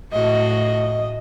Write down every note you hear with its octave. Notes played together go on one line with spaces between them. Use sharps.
A2 F#4 D#5